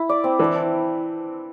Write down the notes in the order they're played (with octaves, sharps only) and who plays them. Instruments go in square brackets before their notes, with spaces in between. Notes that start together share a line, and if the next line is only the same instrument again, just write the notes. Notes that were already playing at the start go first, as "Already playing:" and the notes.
Already playing: [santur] E4
D5
C4
[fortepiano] E3 [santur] D4
[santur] D4